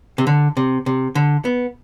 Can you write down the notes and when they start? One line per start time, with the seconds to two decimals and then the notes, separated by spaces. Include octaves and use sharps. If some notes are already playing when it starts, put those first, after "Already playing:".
0.18 C3
0.27 D3
0.57 C3
0.86 C3
1.15 D3
1.45 B3